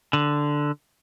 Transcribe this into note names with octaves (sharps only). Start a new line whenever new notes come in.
D3